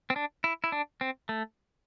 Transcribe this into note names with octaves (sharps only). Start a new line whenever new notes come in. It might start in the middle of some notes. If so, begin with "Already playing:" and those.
C4
D4
E4
E4
D4
C4
A3